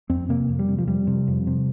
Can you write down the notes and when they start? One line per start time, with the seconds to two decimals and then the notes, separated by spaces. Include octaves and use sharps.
0.09 F2 C4
0.29 C3 A#3
0.49 F2
0.59 G3
0.68 C3
0.78 F3
0.87 F2 G3
1.07 C3
1.28 F2
1.47 C3